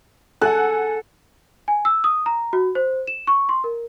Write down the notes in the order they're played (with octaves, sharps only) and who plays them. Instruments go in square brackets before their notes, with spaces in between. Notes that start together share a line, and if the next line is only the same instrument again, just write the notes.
[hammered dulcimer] A4 [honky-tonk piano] F#5 G#5 F#6
[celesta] G#5
E6
D#6
A#5
F#4
C5
E7
C#6
C6
A#4